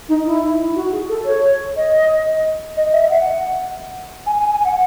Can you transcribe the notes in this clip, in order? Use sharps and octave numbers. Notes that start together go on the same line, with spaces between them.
D#4
E4
F#4
G#4
A4
C#5
D#5
D#5
E5
F#5
G#5
G#5
G#5
F#5